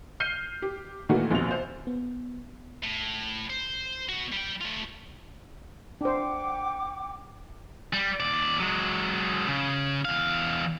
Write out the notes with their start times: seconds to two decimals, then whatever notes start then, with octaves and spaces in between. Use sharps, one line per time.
0.20 F6 G6 C7 D#7
0.62 G4
1.09 A#2 D#3 E3 A3 F#4
1.31 A#1 D#2 B2 F3 C4 F7
1.51 C5
1.87 B3
2.83 A2
3.50 C5
4.09 B3 F#4
4.32 G3 G5
4.61 A3 F4
6.01 D4 C5 F#5 G5 D6
7.93 G3
8.20 D#2 D5
8.60 F#3 G#3
9.48 C#3
10.05 E2 F5